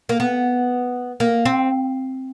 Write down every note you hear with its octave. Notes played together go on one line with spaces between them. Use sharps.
A#3
B3
A#3
C4